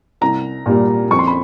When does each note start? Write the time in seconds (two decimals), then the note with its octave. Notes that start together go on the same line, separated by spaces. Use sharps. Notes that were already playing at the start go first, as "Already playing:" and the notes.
0.21 C2 A#5
0.66 A#2 G3 A#3
1.11 F2 C#6
1.19 C6
1.28 B5